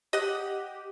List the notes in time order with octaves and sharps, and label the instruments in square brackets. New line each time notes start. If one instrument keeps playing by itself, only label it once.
[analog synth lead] G4 [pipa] D#5 F#5